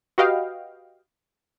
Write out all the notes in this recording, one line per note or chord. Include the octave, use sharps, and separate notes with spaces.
F#4 G4 B4 D#5 F5 G5